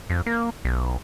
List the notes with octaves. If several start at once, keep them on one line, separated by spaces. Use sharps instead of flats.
F2
A#3
B1